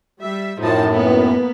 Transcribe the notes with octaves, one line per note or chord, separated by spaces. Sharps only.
G3 E5
F#2 A2 F3 D#4 A5
A#3 B3